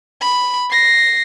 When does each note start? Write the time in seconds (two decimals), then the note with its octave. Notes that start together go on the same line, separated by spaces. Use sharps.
0.22 B5
0.71 A#6 C7